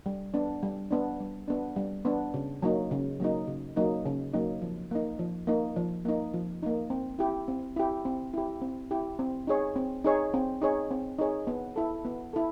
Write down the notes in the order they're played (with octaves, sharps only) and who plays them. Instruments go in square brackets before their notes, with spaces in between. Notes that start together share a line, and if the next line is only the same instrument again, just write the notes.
[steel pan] G3
B3 D4
G3
B3 D4
G3
B3 D4
G3
B3 D4
C#3
F#3 A#3 D#4
C#3
F#3 A#3 D#4
C#3
F#3 A#3 D#4
C#3
F#3 A#3 D#4
F3
A#3 D#4
F3
A#3 D#4
F3
A#3 D#4
F3
A#3 D#4
C4
E4 G4
C4
E4 G4
C4
E4 G4
C4
E4 G4
C4
D#4 G#4 C#5
C4
D#4 G#4 C#5
C4
D#4 G#4 C#5
C4
D#4 G#4 C#5
B3
E4 A4
B3
E4 A4